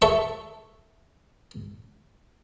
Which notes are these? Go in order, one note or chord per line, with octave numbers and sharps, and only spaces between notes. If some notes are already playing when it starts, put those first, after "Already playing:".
A4 E5 C#6